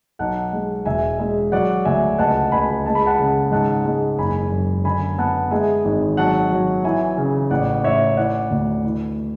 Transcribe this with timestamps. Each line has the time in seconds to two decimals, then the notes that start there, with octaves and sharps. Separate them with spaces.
0.19 B1 F#5 A5
0.53 G#3
0.85 E1 E5 G#5
1.19 G#3
1.52 F#3 D5 F#5
1.85 D2 E5 G#5
2.19 C#2 F#5 A5
2.52 C#2 G#5 B5
2.86 G#3 A5
2.95 B5
3.06 F#5 A5
3.19 C#3
3.52 G#2 F#5 A5
3.85 G#3
4.18 F#1 G#5 B5
4.52 F#2
4.85 D3 G#5 B5
5.18 B3 F#5 A5
5.51 G#3 E5 G#5
5.85 G#1
6.17 F#3 F#5 A5
6.51 F#3
6.84 E3 E5 G#5
7.17 C#3
7.51 A1 D5 F#5
7.84 A1 C#5 E5
8.17 E3 D5 F#5
8.51 D2
8.84 E3